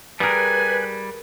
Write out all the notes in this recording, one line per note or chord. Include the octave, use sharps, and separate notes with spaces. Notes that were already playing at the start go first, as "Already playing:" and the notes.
G3 G#4 A#4 B4 G#5